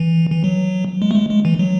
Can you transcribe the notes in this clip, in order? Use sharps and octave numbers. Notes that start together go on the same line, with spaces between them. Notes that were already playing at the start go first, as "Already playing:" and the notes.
Already playing: E3
E3
F#3
G#3
A3
G#3
G#3
E3
F#3